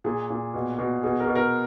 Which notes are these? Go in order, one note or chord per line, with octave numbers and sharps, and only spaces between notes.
A#2 G#4
A#2
B2
B2
B2 G#4
A#4
B2
A#4